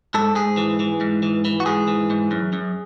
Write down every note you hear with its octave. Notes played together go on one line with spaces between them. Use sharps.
G#2 A4
G#2 G#4
E3
E3
G#2
E3
E3
F#4
G#2 G#4
E3
G#2
F#2
F#2